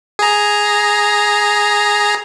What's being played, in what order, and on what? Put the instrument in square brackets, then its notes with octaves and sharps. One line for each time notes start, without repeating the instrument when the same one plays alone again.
[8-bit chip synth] G#4 A#5